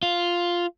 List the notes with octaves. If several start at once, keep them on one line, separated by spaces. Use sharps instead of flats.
F4